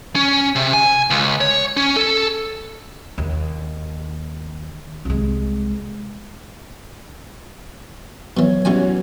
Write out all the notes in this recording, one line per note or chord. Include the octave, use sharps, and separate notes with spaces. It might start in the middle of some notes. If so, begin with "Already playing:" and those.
C#4
C3
G#5
C#2
C#5
C#4
A4
D#2
C2 G#3
B2 E3 F#3 B3 C#5
E3 G3 C#4 E4 F#4 G#5